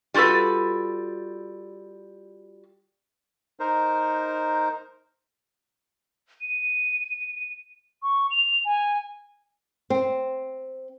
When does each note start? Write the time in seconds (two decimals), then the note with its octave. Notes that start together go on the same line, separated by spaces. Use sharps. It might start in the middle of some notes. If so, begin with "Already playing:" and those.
0.14 G3 F4 F#4 A4 B4
3.60 D#4 A#4 C5
6.41 D#7
8.03 C#6
8.31 F7
8.65 G#5
9.90 C4